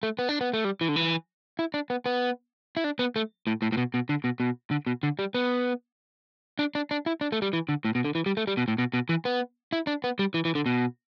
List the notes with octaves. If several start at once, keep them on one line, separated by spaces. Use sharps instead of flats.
A3
B3
D4
B3
A3
G3
E3
D3
E3
E4
D4
B3
B3
E4
D4
B3
A3
A2
A2
A2
B2
B2
D3
B2
B2
D3
B2
D3
G3
B3
D4
D4
D4
E4
D4
A3
G3
E3
D3
A2
B2
D3
E3
G3
A3
G3
B2
A2
B2
B2
E3
B3
E4
D4
B3
G3
E3
E3
D3
B2